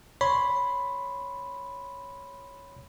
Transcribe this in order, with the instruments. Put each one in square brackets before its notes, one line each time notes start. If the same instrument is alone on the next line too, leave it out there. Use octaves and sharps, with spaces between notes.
[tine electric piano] C#5 B5 C6